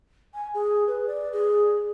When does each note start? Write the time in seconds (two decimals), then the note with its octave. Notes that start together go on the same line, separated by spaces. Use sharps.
0.34 G#5
0.54 G#4
0.87 B4
1.07 D5
1.33 G#4